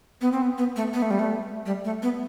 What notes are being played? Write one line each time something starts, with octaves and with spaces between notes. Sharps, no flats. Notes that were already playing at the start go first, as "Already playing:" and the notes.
B3
C4
B3
B3
A3
B3
A3
G3
A3
G3
A3
B3